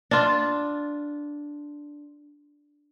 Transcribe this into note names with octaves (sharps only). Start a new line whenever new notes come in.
D4 F4